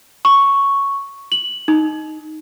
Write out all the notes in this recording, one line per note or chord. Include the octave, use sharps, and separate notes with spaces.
C#6
F#7
D#4